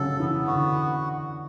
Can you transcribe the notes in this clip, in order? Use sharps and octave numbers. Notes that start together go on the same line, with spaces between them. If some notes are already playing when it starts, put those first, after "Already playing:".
Already playing: C#3 F#3 A4
E3 B3
D3 F#4